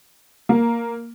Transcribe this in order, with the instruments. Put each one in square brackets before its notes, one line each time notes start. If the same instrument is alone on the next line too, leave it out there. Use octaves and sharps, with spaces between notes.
[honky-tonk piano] A#3